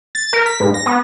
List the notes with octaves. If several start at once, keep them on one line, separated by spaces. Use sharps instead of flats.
A6
A#4
B6
G#2
A#6
B3